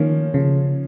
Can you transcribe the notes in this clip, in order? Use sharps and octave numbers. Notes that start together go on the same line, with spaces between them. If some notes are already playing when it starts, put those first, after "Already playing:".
Already playing: D#3 F3 A#3 C#4
C#3 F3